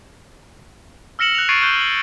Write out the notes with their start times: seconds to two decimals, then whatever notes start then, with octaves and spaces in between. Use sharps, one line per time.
1.19 E6 F6 A#6 C#7 E7 F#7
1.35 F#6 F7
1.49 C#6 G#6 A6 C7 D7 D#7
1.62 C#6 F#6 G6 G7
1.81 F#7